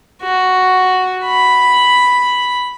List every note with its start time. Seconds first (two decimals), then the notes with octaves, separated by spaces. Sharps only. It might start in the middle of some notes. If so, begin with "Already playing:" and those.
0.22 F#4
1.25 B5